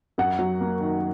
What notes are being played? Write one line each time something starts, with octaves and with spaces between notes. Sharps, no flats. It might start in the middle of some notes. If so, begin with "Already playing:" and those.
F#2 F#5
F#3
A#3
D#3